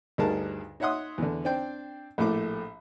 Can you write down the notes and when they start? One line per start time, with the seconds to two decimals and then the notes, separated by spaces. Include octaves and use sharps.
0.18 D2 G2 D#4 G#4 A#4 A5
0.80 D#4 C#5 E5 F#5 C6 D#6
1.18 E2 D3
1.45 C4 D4 D5 G5
2.18 A#1 A2 A3 D6